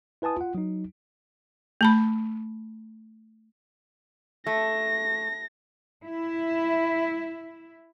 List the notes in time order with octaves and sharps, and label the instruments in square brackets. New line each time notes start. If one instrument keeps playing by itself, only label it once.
[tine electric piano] E4 B4 G#5 A5 D#6
F4 F#5
F#3 D#4
[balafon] A3 A5 B5
[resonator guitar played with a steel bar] A3 [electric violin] A#6
[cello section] E4 E5